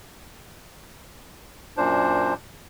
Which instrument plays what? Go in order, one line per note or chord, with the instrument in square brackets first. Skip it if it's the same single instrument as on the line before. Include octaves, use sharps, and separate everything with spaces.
[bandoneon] F#2 A#2 D4 C5